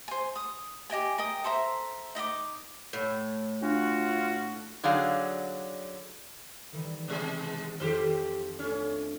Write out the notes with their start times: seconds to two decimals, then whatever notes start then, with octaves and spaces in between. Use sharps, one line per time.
0.08 C5 G#5
0.36 D#6
0.90 G4 D#5 G5 G#5
1.18 A#4 D#5 G5 D#6
1.44 A4 C5 E5 A#5
2.15 D#4 D#5 E5 D6
2.93 A2
3.62 D4 F4 F#4
4.84 D3 F#3 D#4 G#4 D5 F5
6.72 D#3 E3 G3
7.08 B2 G#3 G#4
7.80 F2 D#3 G4
8.59 A3 C#4 D4 F4